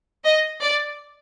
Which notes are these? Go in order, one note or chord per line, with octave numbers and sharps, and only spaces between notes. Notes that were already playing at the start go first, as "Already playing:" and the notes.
D#5
D5